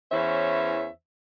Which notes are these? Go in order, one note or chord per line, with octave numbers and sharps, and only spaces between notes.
E2 E3 C#4 C5 C#5 E5